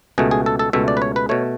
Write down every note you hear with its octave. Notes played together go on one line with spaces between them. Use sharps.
C#2 B2 A3 G#4
G#4
A4
A4
C#2 B2 A3 E5
D5
B4
C#5
B4
B2 A3 C#5